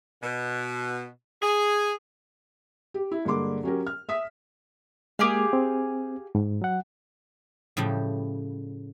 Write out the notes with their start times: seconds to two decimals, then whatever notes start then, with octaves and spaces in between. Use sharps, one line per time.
0.23 B2
1.42 G#4
2.94 G4
3.12 E4
3.25 G2 D3 G#3 A#3 C6 D6
3.64 F#3 C#4 G4 A#4
3.87 F6
4.09 E5 D#6 B6
5.19 G#3 A#3 G4 G#4 F5
5.53 C4
6.35 G#2
6.62 F#3 F#5
7.77 A2 C#3 F3 G3